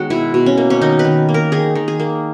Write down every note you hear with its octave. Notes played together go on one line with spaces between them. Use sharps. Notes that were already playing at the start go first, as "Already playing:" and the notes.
Already playing: D#3 G#3 B3 F#4 C#5
B2 E4
B2
C#4
A#3
C#4
D#3 D#4
B4
D#3
A#3
A#4
D#3 G#4
D#3
G#4
A#3